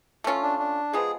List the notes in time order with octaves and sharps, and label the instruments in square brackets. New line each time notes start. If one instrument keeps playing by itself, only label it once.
[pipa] A3 C#4 F4
[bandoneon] D4
D4
[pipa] F3 G#3 B3 [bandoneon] G#4